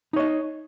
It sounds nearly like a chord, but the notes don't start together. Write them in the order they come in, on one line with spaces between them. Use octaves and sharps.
D#4 C#5 D#5